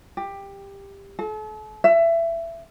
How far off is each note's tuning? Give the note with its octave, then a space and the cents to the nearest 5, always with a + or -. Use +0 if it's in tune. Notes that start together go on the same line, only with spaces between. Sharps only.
G4 +15
A4 -40
E5 +20